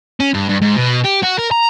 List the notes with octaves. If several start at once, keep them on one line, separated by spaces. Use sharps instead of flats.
C#4
G2
G2
G#2
B2
G4
F#4
A#4
A#5